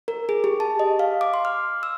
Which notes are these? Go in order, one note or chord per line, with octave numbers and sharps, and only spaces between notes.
A#4
G#4
G4
A5
D#5
F5
D6
C6
F6
E6